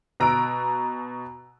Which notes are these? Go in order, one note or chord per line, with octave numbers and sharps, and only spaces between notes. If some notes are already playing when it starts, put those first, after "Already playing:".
B2 A#5 E6 F#6 D7